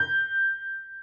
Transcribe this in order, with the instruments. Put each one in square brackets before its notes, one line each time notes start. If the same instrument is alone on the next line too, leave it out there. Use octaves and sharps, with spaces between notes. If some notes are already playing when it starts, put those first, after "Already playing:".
Already playing: [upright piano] G6